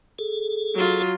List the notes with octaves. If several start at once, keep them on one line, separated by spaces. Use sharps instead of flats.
G#4 A4
F#3 F4